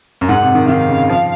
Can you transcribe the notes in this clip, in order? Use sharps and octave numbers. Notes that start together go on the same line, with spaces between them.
F#2
G#2 F#5
C3
D#3
D#3 F5
C#3
F3